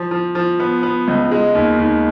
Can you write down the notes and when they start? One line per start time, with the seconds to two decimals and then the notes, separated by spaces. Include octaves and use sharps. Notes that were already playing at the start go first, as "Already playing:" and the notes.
Already playing: F3
0.11 F3
0.35 F3
0.60 B3
0.83 B3
1.08 C#2
1.31 G#3
1.55 D#2
1.79 D#2